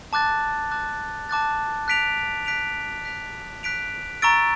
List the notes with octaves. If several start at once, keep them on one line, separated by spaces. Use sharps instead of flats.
A5 D6 F#6 A6
A5 D6 F#6 A6
A5 D6 F#6 A6
F#6 B6 D7 F7
F#6 B6 D7 F7
F#6 B6 D7 F7
F#6 B6 D7 F7
A#5 C#6 E6 A6 D7